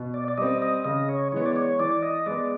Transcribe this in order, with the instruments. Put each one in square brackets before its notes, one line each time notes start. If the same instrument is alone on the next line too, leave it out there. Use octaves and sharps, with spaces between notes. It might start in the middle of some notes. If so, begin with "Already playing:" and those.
Already playing: [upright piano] B2
[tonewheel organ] D5
D5
[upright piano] G3 C4 [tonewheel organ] D#5
[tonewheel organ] D#5
[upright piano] C#3 [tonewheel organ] D#5
[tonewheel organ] C#5
[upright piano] E3 G#3 B3 [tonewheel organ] C#5
[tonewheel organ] D5
C#5
[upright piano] E3 [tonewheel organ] D5
[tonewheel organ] D#5
[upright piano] G#3 B3 [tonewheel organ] D5